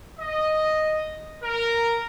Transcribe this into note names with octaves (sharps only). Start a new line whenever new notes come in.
D#5
A#4